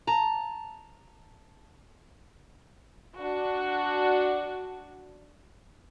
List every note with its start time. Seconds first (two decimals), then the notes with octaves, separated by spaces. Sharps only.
0.07 A5 A#5
3.17 D4 F#4